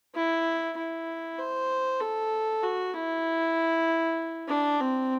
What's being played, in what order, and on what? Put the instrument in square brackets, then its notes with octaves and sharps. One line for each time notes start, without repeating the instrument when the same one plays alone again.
[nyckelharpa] E4
E4
C5
A4
F#4
E4
D4
C4